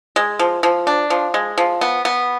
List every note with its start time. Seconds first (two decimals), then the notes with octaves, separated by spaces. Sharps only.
0.16 G#3
0.39 F3
0.63 F3
0.87 D4
1.10 F3
1.34 G#3
1.58 F3
1.81 B3
2.05 B3